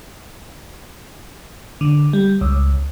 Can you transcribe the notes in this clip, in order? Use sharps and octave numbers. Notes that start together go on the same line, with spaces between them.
D3
G3
C#2